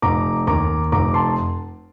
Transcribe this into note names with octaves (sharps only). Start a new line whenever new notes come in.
F1 A#5 D6
D#2 A#5 D6
F1 A#5 D6
A5 C6